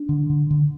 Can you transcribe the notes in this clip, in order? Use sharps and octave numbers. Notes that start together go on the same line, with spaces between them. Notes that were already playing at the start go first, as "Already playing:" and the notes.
Already playing: D4
D3
D3
D3